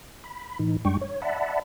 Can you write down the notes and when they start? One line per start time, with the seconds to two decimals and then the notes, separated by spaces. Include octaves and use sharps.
0.24 B5
0.59 A2 E3 D#4
0.85 F#2 G3 G#3 D4 G5 C#6
1.01 C#5
1.22 D5 E5 F#5 A5 B5